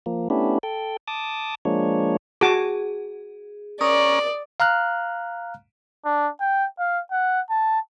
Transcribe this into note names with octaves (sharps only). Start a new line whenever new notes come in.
F3 A#3
A3 B3 C#4 D4 E4 G4
A4 G5
A5 D6 D#6
F3 G#3 A#3 D4 C#5
F#4 G#4 A5 D6
C#4 A#4 D5 D#6
F5 A#5 F6 F#6
D4
G5
F5
F#5
A5